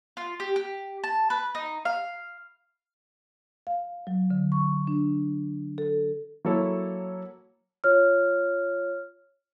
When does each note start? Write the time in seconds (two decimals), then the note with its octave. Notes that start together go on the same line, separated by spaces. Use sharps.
0.17 F4
0.40 G4
0.56 G4
1.04 A5
1.30 B4
1.55 D#4
1.85 F5
3.67 F5
4.07 F#3
4.30 D3
4.52 C#6
4.87 D4
5.78 A4
6.45 F#3 A#3 E4 A4 C#5
7.84 F4 C#5 F6